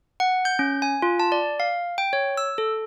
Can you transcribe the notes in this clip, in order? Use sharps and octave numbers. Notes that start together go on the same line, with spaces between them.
F#5
G6
C#4
G#5
F4
A5
D5
F5
G5
C#5
E6
A4